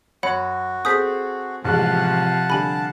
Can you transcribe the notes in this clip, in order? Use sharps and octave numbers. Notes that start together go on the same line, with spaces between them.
F#2 F#4 C#5 F#5 B5
C4 G#4 A4 D#6 G6 B6
A1 C3 F3 G#3 F5 F#5 A5 F#6
D3 G3 G#5 B5